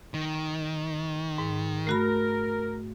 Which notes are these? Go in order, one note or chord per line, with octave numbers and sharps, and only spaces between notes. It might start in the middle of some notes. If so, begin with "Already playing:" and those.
D#3
G#2
A3 F#4 A#4 B5